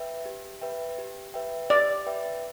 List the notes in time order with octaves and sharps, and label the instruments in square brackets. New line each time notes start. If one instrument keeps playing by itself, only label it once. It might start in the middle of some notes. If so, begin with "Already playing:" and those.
Already playing: [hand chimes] B4 E5 G5
G4
B4 E5 G5
G4
B4 E5 G5
[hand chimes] G4 [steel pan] D5
[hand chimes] B4 E5 G5